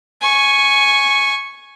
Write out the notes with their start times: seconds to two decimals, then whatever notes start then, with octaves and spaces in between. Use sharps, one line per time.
0.22 G#5 C#6